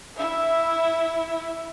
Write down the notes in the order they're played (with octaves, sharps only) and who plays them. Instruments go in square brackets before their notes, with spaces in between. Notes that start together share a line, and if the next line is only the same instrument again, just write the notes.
[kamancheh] E4 E5